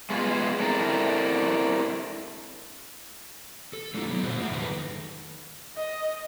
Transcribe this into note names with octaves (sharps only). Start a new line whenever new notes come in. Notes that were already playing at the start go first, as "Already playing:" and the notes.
G#3 A3 B3 E4 F4 G#4
C4 D4 E4 A4 A#4
A4
G#3 A#3 D4 E4 F4
F#3 B3
A#2 F#4 C5
A3 F4 G#4 E5 F#5
F2 D#3 A4 B4
D#5